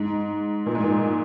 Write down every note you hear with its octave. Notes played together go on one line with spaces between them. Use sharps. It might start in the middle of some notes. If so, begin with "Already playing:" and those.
Already playing: G#2
A#2
G#2
A#2